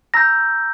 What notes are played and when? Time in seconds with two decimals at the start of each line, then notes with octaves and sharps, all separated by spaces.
0.14 A#5 E6 G6 A#6